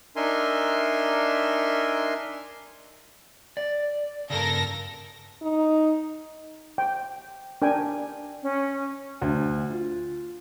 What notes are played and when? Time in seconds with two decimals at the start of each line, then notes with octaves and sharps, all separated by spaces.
0.16 D4 D#4 A#4 E5 G#5 C6
3.57 D5
4.30 G2 C#3 A4 A#4 A#6
5.42 D#4
6.78 G5
7.62 D4 A#4 G5 G#5
8.42 C#4
9.21 D2
9.70 F4